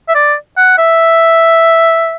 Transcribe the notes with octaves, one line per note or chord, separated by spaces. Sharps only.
E5
D5
F#5
E5